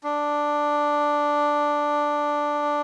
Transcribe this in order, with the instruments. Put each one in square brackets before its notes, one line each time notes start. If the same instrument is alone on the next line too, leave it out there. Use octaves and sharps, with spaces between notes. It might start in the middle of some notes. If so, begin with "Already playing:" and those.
[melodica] D4